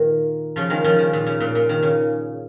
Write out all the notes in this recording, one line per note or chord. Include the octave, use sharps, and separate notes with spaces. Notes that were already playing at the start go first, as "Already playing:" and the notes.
Already playing: A#2 D#3
C#3 F3
D#3 G#3
C#3 F3
D#3
A#2
C#3
A#2
A#2
D#3
C#3